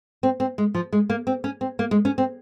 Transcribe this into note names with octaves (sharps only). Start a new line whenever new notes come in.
C4
C4
G#3
F3
G#3
A#3
C4
C#4
C4
A#3
G#3
C#4
C4